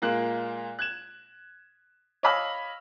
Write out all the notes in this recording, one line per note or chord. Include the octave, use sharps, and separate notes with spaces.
A#2 G#3 A#3 F#6
F#6 G#6 E7
C#5 D#5 F5 B5 E6 F6